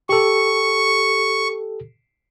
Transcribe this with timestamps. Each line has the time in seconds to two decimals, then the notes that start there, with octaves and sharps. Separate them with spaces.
0.09 G4 A4 C#6